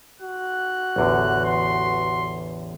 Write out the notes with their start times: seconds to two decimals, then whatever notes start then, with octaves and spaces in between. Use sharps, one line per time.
0.21 F#4 F#6
0.96 A1 E2 D3
1.45 C6